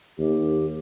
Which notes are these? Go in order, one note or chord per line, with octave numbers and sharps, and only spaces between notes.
D#2 G4